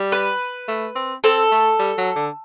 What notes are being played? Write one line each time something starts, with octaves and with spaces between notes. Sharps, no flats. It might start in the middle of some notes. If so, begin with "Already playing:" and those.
Already playing: G3
B4
A3
C4
C4 A4
A3
G3
F#3
D3